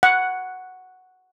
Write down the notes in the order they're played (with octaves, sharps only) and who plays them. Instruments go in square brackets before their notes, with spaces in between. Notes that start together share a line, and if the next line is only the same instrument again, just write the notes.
[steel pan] F#5